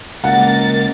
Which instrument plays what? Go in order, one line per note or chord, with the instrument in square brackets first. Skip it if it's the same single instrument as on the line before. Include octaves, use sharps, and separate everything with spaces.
[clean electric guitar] C#2 [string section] A#3 A#4 A6 [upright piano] F#5